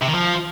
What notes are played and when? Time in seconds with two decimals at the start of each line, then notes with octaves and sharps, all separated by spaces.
0.02 C3
0.08 D#3
0.14 F3